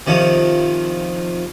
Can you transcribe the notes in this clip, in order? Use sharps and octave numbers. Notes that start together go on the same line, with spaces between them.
C3 D#3 F3 C#5